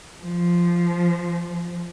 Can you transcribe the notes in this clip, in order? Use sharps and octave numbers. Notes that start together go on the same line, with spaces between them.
F3